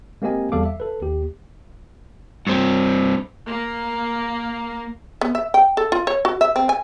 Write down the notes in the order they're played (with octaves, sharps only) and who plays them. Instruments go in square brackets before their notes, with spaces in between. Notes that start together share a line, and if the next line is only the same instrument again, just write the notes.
[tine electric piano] G#3 A#3 C4 G4 D#5 G#5
E2 G3 A4 F5 D6
E5
A4 B4
D#2 G4
[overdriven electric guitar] G2 C4
[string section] A#3
[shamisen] B3
E5
G5
A4
F4
C#5
F#4
E5
C4
G#5